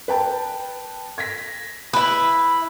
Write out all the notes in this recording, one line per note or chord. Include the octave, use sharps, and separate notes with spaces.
B4 G5 A5
G#6 A#6 B6
E4 B4